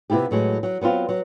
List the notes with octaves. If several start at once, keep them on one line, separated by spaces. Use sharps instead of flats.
C3 B3 E4 F4 G4
A2 F#3 G#3
F#3
F#3 B3 C4 F4
F#3